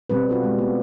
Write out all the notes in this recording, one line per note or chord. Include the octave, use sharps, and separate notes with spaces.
B2 G3 C4 B4
F4 F#4 A4
G#3
B3